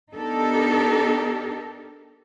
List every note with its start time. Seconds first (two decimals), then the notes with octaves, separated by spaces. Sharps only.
0.13 B3 D4 D#4 G4 A4 A#4